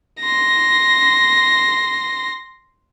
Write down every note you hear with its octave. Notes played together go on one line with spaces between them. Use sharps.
C6 A#6